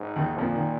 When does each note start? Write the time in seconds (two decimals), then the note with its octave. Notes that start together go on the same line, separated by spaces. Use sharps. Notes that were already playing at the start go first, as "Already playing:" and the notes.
Already playing: G#2
0.16 D#2 D#3
0.38 F2 A#2 F3
0.55 D#3